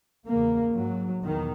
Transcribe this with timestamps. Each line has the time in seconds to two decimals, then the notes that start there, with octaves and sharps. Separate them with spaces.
0.26 E2 C#3 A#3
0.75 G#2 F#3
1.23 E2 B2 D#3